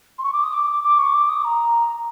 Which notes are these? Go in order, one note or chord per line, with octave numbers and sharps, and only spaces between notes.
C6
C#6
D6
D#6
D6
D6
C#6
D6
D#6
A#5